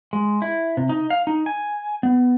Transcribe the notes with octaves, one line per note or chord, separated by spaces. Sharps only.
G#3
E4
C3
D#4
F5
D#4
G#5
B3